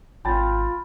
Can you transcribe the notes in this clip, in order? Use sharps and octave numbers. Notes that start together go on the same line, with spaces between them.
G#1 F4 G5 A5 B5 A6